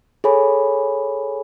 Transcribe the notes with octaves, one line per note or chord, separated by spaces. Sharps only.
G#4 A4 C#5 G#5 B5